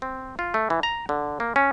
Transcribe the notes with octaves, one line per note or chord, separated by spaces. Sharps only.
C4
F4
A3
E3
A#5
D3
A#3
C#4